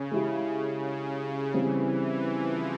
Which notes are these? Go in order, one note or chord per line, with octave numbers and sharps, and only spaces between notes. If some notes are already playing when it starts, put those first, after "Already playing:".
Already playing: C#3
G#3 E4 G4
C#3
C#3 E3 G3 C4 E4 G#4
F3